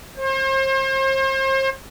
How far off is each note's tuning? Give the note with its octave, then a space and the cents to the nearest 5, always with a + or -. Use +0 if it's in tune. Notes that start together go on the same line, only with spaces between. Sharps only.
C5 +35